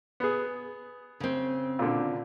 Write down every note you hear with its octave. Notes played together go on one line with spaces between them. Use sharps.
B3 G#4
C#3 C4
A#2 D3